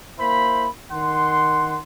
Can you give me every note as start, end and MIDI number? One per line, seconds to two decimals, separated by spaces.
0.19 0.67 58
0.19 0.67 64
0.19 0.67 72
0.19 0.67 83
0.92 1.78 51
0.92 1.78 78
0.92 1.78 84